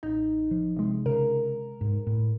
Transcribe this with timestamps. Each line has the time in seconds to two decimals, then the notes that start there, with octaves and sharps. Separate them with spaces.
0.03 A1 D#4
0.51 F3
0.77 C3 G#3
1.06 C#3 A#4
1.81 G#2
2.07 A2